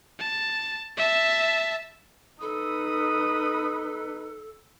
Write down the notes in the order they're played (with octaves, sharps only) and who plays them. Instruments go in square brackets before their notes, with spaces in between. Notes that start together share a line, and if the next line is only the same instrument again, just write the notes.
[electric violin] A5
E5 A5
[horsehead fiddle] D#4 B4 [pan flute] A4 [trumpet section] B5 D#6